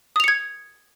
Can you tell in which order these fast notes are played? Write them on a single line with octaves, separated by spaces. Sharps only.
D#6 F7 C#7 G#6